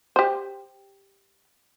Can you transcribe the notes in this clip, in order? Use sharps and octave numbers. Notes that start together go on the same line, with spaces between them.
G4 C5